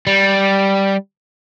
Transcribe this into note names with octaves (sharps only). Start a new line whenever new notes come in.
G3